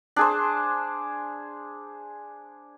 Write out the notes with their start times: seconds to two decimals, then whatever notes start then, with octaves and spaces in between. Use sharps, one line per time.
0.16 D4 G#4 C5